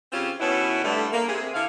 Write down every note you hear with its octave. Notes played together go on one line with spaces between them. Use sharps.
C#3 C4 C#4 F4 G4 C5
B2 D#3 B3 C#4 E4
G2 D3 A3
A#3
C3 G#4
D3 E4 F5